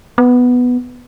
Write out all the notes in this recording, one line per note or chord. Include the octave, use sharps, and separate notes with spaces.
B3